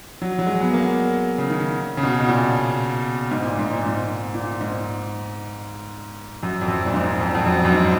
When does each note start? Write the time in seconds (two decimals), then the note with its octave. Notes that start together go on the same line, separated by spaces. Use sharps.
0.22 F#3
0.39 F#3
0.46 G#3
0.61 B3
0.73 A#3
1.38 C#3
1.50 D#3
1.97 C#3
2.03 B2
2.20 B2
2.28 A#2
3.31 G#2
3.45 A#2
3.59 G#2
3.73 A#2
3.86 G#2
4.35 A#2
4.61 G#2
6.43 F#2
6.61 F2
6.68 F#2
6.86 A#2
6.94 G#2
7.20 F2
7.35 F2
7.46 F#2
7.65 F#2
7.72 G#2